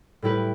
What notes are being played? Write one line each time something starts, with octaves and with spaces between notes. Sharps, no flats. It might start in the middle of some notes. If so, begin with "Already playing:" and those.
A2 G3 E4 G4 B4